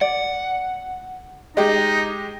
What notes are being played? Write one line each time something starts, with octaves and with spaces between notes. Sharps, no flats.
D5 F#5
G#3 D#4 G4 D#5